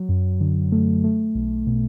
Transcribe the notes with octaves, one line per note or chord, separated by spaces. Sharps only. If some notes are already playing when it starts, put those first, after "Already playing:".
Already playing: F#3
F#2
D3
A3
A3
B1
B2